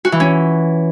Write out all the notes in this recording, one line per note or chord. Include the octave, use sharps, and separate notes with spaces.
F#4
E3
C#4